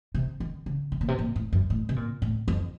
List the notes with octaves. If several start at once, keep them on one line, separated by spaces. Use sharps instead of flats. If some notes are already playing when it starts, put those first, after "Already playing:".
C3
D#3
C#3
C3
A#2
C3
A#2
A2
F#2
A2
C3
A#2
A2
F2